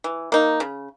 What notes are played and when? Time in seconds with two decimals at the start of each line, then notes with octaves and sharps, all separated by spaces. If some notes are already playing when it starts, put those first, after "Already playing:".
0.04 E3
0.32 A#3 D#4
0.60 C#3